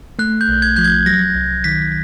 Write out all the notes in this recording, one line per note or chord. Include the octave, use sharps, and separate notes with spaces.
A3 F#6
G6
B1
G#6
F3 G6
G#6
F#3 A#6
C2
D#3 B6